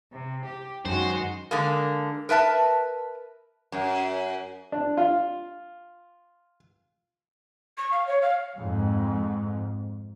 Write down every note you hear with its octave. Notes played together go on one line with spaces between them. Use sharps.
C3
G4
F#2 D#3 G#3 F#4 C5
D3 G#3 A#3
A#4 B4 E5 A5
F#2
D4
F4
C#6
F5
C#5
F5
F2 G#2